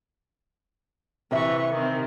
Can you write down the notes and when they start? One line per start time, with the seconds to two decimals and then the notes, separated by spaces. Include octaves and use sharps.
1.31 C3 E3 E5 C#6
1.74 D#3 C4